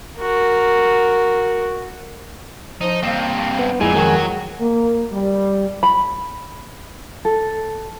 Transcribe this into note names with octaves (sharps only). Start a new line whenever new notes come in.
F#4 A#4
F3 D#4
G2 A#3 C4
B3
F2 A#2 G#3 E4 G#5
D#3 F#3 F#4
A#3
G3
B5
A4